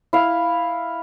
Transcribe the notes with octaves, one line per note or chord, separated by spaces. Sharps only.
E4 F5